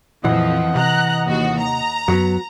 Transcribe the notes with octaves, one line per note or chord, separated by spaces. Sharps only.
F2 A#2 E3 F3 D#5 F#5
C3 A#5 F#6
D#2 F#4
A#5
F#2 F#3 B3